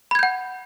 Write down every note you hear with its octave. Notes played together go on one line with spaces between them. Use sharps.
F#5 B5 G6 G#6